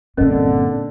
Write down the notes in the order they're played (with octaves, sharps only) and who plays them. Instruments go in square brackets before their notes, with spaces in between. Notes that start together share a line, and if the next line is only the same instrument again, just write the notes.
[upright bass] G2 A#2 [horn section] D3 [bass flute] C4 [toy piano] C#4 A#4 D#5